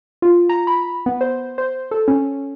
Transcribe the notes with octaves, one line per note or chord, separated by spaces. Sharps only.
F4
A#5
B5
B3
C5
C5
A4
C#4